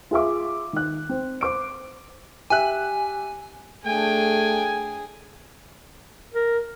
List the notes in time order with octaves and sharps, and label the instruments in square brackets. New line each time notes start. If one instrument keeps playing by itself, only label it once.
[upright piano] F4 G#4 E5 D6
D#3 F#6
C4
C5 D6 D7
[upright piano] G4 E5 F#6 [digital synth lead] G#5
[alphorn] A3 [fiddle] D4 G5 [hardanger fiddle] G#4 [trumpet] G#5
[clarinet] A#4